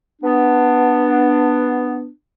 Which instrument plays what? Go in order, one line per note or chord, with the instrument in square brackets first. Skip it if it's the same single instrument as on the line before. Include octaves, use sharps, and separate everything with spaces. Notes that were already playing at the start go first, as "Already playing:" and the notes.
[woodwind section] B3 D4